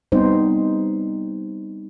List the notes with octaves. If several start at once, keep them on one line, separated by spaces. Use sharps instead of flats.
G3 B3 C4 D#4 C5